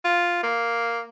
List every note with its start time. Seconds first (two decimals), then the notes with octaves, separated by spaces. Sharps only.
0.04 F4
0.43 A#3